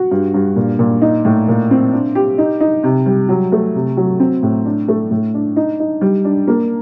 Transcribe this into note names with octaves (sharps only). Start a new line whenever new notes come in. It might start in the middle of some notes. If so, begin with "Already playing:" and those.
Already playing: F#4
G2
G2
A#2
A#2
D#4
A2
A#2
C4
D4
G4
D#4
D#4
C3
G3
F#3
A3
C3
F#3
C4
A2
D4
A3
A2
D4
D#4
D#4
G3
D4
A#3